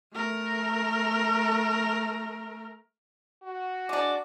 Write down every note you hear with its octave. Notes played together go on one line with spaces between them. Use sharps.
A3 A#4
F#4
G#3 D4 D6